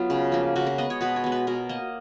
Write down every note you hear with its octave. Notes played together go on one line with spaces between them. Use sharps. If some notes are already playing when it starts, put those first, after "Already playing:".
Already playing: F#3 B3 F4
C#3
F3 A#3
C#3 F#4
A#4
G#3 B3 D#5
C#5
B2 B4
C#5
G#3 B3
B4
B2 A#4
A#3 D#5